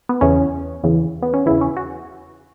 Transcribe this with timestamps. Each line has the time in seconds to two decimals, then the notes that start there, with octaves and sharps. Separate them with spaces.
0.09 B3
0.21 E2 C#3 E3 C#4
0.83 E2 C#3 E3
1.22 B3
1.34 C#4
1.46 E2 C#3 E3 E4
1.61 C#4
1.77 F#4